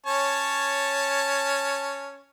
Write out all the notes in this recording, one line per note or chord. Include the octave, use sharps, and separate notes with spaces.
C#4 C#5 A5